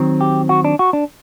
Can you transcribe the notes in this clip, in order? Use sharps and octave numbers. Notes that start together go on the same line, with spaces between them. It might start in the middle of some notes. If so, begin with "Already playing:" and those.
Already playing: D#3 F#3 C4
G4
F#4
D4
F#4
D4